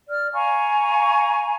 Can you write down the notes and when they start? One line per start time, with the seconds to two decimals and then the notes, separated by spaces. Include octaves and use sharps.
0.09 D5 F6
0.34 F5 G#5 A#5 C#6